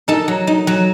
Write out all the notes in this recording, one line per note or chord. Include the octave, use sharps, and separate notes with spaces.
D#4 A4 A5
F#3
D#4
F#3